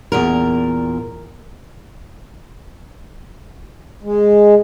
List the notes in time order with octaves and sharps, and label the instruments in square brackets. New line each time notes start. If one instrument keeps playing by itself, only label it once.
[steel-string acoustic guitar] E2 A#2 A#4
[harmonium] G#3